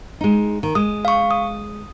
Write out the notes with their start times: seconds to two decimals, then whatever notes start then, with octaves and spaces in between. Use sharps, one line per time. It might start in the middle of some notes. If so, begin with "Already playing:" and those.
0.21 G#3 D#4
0.63 D#3
0.75 G#3 D#6
1.05 F5 C#6
1.31 D#6